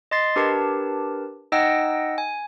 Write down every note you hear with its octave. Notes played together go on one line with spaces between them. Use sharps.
D#5 C6 A6 C7
D4 G4 A#4 B4 A5
D#4 D#5 F#5 G5 E6 A#6
G#5